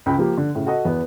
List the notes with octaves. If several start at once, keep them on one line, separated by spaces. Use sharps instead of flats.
C#2 C#3 G5 B5
F3 A#3 G4
D3
A2 C#3
F#4 A4 D#5 F#5
E2 B3